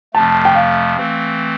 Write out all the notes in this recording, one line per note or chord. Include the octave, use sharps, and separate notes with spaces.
F2 C3 F3 A3 A5
G5
F5
E3 A3 C4